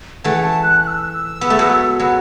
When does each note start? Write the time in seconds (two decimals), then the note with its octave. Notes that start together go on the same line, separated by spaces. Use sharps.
0.24 E3 A3 F#5
0.44 A5
0.63 F#6
0.83 F#6
0.87 E6
1.41 B3
1.50 A3
1.59 F#3 B3
1.99 F#3 B3